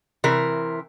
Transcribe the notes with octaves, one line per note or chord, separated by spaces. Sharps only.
C3 E3 A#4